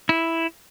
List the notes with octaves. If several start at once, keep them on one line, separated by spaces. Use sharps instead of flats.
E4